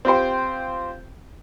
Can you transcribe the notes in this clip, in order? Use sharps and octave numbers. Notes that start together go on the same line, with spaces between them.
C4 F4 G4 C5 G5